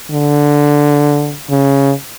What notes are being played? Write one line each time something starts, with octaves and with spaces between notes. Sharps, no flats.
D3
C#3